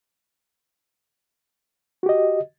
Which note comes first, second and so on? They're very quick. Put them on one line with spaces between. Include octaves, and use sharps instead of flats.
F#4 G4 D#5